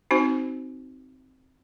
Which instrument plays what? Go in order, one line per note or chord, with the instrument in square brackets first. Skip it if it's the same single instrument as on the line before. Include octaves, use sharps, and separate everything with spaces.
[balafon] C4 D#4 F#4 C5